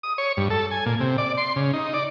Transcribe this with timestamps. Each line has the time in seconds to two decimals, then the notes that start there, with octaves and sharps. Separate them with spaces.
0.03 D#6
0.18 C#5
0.37 G2
0.50 A4
0.71 G#5
0.86 A#2
1.00 C3
1.18 D5
1.38 C6
1.56 C#3
1.73 D#4
1.94 D5